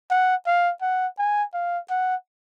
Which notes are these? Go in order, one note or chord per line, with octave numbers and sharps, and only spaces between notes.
F#5
F5
F#5
G#5
F5
F#5